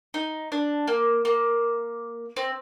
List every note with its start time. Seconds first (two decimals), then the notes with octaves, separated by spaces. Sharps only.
0.14 D#4
0.52 D4
0.87 A#3
1.25 A#3
2.36 C4